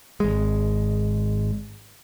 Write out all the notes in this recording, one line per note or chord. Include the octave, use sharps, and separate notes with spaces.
G#1 G#3